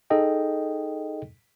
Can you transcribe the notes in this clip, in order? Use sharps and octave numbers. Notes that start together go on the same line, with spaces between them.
D#4 G#4 A4 D#5 G5